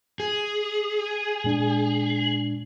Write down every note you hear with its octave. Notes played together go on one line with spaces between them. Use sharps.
G#4
A#2 G#3 D4